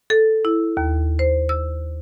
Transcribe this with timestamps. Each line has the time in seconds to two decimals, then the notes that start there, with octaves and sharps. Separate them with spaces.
0.10 A4
0.45 E4
0.77 D#2
1.19 C5
1.49 E6